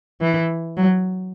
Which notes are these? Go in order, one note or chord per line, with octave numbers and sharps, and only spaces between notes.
E3
F#3